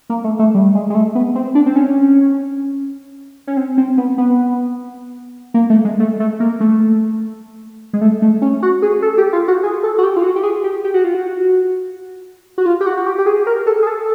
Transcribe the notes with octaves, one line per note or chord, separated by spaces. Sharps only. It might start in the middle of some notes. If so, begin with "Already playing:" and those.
A#3
A3
A3
G3
G#3
G#3
A3
B3
C4
D4
C4
C#4
C#4
C4
C4
B3
B3
A#3
A3
G#3
A3
A3
A#3
A3
G#3
A3
A3
C#4
F#4
G#4
A4
G4
F4
F#4
G#4
A4
F#4
G4
F4
F#4
G4
G#4
G4
G4
F#4
F4
F#4
F#4
F4
G4
F#4
F#4
G4
G4
G#4
A#4
A4
G#4
A4